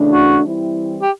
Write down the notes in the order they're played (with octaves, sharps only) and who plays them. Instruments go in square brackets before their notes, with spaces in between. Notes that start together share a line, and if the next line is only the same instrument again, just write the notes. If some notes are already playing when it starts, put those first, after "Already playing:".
Already playing: [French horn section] C#3 E3 A3 D4
[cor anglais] F#4
[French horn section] E3 G3 C4 E4
[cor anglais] G4